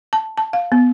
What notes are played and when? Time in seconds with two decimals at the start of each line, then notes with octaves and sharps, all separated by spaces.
0.13 A5
0.38 A5
0.53 F5
0.72 B3